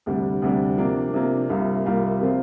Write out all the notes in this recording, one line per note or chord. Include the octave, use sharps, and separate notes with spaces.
D2 C3 G3 D4
D2 C3 G3 D4
C3 F3 A#3 D4
C3 F3 A#3 D4
C2 C3 G3 A#3 F4
C2 C3 G3 A#3 F4
C3 F3 C4 F4